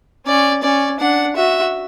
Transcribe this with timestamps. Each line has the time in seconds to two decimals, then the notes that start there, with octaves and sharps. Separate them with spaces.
0.26 C#4 D5
0.63 C#4 D5
1.00 D4 F#5
1.36 F#4 E5